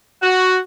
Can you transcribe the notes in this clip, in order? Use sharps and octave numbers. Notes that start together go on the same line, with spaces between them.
F#4